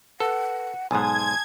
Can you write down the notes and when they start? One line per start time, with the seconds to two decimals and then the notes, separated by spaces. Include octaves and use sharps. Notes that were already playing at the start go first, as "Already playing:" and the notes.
0.20 A4 B4 F#5
0.91 B1 G#2 G#5 A5 C6 D#6 G#6